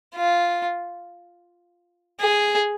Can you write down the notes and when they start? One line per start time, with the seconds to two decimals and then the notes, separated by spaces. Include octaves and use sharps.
0.15 F4
2.21 G#4